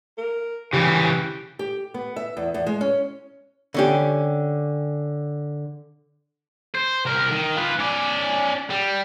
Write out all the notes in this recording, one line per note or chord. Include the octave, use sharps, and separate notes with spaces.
A#4
C#3 E3 G4
G4
B3
E5
E2
E2
G#3
C#4
D3 C#4 G4
C5
C2 A#4
D#3
F4 B4
C#4 D5
G3